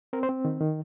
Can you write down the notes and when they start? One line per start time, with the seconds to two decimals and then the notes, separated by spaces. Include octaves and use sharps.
0.13 C4 A#4
0.23 C5
0.29 C4
0.45 D#3
0.61 D#3